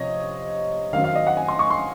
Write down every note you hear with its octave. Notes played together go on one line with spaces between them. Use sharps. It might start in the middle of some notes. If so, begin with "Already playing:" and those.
Already playing: C3 F3 C4 C#5 D#5
D#3 F#3 C4 F5
F5
D#5
F#5
G#5
C6
C#6
C6